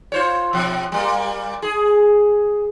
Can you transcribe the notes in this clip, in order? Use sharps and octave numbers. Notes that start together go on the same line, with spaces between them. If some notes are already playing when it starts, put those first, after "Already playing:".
F4 C5 C#5
B2 F3
G3 A#3
G#4